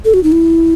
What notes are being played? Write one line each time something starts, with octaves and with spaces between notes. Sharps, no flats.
A4
F#4
D#4
E4